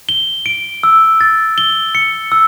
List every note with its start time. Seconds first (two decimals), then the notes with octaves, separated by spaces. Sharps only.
0.09 G7
0.46 D7
0.83 E6
1.21 A6
1.58 G7
1.95 C#7
2.32 E6